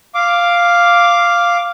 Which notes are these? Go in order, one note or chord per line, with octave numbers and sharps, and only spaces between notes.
F5 D6